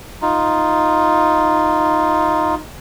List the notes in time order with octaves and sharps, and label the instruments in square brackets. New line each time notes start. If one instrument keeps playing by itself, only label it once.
[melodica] D#4 F4